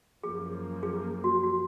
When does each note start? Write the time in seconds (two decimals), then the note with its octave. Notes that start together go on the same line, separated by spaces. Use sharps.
0.23 F#2 F3 A#3 G#4
0.83 G#4
1.24 F#4
1.43 F#4